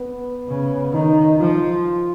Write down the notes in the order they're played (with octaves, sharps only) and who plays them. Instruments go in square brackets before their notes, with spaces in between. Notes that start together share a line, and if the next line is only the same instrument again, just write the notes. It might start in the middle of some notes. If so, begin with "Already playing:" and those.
Already playing: [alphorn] B3
[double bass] C#3
[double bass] D#3 [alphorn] D#4
[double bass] F3 [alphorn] F4